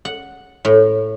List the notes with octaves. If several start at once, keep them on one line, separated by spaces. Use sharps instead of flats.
F#5
A2